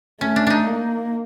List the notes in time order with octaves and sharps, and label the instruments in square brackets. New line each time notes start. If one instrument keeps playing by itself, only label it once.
[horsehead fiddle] A3 [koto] C#4
[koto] D4
D4 D#4
[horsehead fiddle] A#3